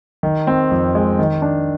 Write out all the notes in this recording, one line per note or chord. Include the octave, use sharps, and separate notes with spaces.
D#3
C4
F2
G#3
D#3
D4